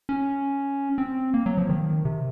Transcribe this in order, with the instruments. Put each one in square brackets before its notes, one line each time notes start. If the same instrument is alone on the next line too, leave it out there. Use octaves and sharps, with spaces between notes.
[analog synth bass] C#4
C4
A#3
F#3
F3
D#3
C3